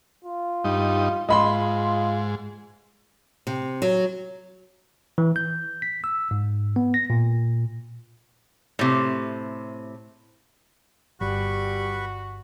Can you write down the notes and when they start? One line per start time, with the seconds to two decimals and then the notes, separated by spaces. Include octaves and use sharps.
0.24 F4
0.64 G2 D#4
1.29 G#2 F4 D#5 B5 C6
3.47 C3
3.82 F#3
5.18 E3
5.36 G6
5.82 B6
6.04 E6
6.31 G#2
6.76 B3
6.94 A#6
7.10 A#2
8.79 A2 C3
11.21 G1 G3 F#4 B4 B5 C#6